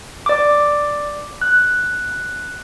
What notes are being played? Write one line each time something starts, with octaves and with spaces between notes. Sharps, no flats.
D5 D6
F#6